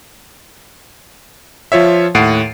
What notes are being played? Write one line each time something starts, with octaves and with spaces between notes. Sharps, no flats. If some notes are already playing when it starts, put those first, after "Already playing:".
F3 F4 C#5 E5
D#2 A2 F#5 C7 D7 D#7